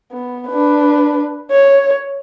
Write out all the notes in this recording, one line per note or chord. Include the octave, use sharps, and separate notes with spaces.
B3
D4 B4
C#5